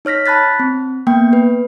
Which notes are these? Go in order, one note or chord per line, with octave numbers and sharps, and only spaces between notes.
D#4 C#5 F6 A#6 B6
A5 B5 F#6 A6 B6
C4
A#3 B3 G5
B4